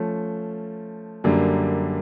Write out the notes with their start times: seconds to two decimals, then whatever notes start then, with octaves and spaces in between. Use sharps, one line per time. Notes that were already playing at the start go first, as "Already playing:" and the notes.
Already playing: F3 A3 C#4
1.24 F#2 D3 G3 A#3